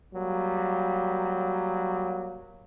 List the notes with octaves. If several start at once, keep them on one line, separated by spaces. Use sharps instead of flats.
F#3 G3 A#3